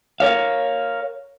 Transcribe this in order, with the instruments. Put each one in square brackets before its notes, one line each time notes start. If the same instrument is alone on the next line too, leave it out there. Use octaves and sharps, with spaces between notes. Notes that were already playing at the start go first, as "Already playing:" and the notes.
[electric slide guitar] A#4 C#5 F5